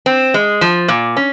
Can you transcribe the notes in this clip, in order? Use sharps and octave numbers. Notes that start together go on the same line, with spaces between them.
C4
G#3
F3
A#2
C#4